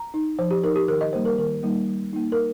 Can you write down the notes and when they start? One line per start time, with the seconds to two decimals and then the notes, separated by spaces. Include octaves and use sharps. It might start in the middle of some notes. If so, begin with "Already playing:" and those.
Already playing: A#5
0.14 D#4
0.39 F3 C5
0.51 G4
0.63 D#4 A#4
0.76 G4
0.88 D#3 A#4
1.01 D#5
1.13 G3 A#3 D#4 C5
1.25 A#4
1.38 D#3 A#4
1.63 G3 A#3 D#4
1.88 G3
2.13 A#3 D#4
2.32 A#4